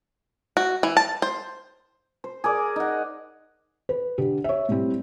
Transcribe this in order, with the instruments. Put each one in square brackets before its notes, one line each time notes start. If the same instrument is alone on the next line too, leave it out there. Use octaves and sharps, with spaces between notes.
[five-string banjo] F#4
E3
A5
C5
[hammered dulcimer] C5
G#4 A#4 D5
D#4 F#5
[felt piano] B4
D3 G4
C#5 E5
A2 G3 C4